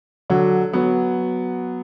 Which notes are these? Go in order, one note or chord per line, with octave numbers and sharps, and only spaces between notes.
D3 F#3
F#3 B3